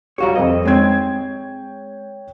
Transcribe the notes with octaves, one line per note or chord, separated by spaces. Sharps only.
G3 F#4 G4 C#5 F5 A#5
F2 C4 D#5
G#3 C4 C#5 G5 G#6